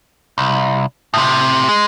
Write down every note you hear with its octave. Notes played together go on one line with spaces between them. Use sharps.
C2
A2 C3
G#3